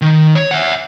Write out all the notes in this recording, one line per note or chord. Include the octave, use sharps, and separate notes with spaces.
D#3
C#5
E5 F#5